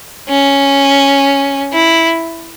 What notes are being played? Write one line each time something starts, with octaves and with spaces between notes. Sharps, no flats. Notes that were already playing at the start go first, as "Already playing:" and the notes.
C#4
E4